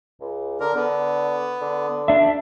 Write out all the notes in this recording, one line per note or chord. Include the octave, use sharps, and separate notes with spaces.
C#2
D3 A#4
D3 B3
D3
D4 E5